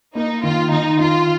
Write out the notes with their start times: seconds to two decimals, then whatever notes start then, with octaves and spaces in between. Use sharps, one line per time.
0.15 A#3 D#4
0.43 D#3 F4
0.72 D#3 D#4
1.00 D#3 F4